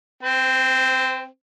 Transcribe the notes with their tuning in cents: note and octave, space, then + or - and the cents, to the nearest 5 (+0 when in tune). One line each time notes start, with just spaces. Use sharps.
C4 +0 C5 -30